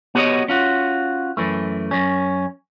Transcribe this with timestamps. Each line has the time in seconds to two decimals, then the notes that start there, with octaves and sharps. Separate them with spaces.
0.15 B3 F#4 G4 A#4 C#5 D#5
0.48 C#4 F4 F#4
1.37 F#2 E3 A3
1.91 F#2 C#4